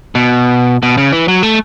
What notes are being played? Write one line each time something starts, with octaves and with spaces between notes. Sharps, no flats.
B2
B2
C#3
E3
F#3
A3